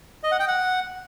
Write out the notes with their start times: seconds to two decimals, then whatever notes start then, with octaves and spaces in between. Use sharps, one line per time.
0.23 D#5
0.32 F#5
0.40 G5
0.48 F#5